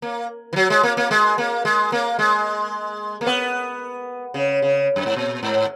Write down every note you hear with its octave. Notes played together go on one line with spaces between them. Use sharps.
A#3
E3
F#3
G#3
A#3
A#3
G#3
A#3
G#3
A#3
G#3
A#3
B3
C#3
C#3
F#2
G#2
A#2
G#2